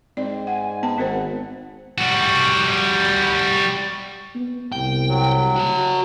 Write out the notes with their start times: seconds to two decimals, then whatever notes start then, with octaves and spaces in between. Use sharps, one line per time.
0.17 G#2 C4 D5
0.47 F#5 G#5
0.83 B3 G5 A5
0.98 G#1 C4 A#4 C5 F#5
1.98 G3 F#4
4.35 B3
4.72 C2 G5
5.09 F#3
5.56 F#4 A5